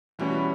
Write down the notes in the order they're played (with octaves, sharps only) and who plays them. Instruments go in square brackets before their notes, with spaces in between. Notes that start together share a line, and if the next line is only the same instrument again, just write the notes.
[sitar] B2 [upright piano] E3 G3 C#4